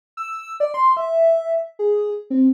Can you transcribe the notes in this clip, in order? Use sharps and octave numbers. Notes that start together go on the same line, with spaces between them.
E6
D5
C6
E5
G#4
C4